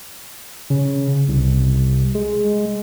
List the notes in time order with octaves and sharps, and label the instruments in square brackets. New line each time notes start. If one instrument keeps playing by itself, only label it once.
[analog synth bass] C#3
C2
G#3